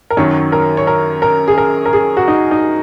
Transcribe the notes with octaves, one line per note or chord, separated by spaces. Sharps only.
A#4
F#2 D#3 F#3 C#5
A#4
C#5
A#4
A#4
G#4
A#4
A#4
G#4
F#4
D#4
D#4